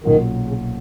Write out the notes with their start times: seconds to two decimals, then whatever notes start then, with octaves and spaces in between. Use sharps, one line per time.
0.03 B1 A#2 D#3 F#3 C#4 F4
0.47 C#3